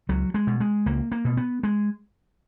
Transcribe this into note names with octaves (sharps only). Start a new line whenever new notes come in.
C#2 F#3
G#3
B2
G#3
C#2 A#3
A#3
B2
B3
G#3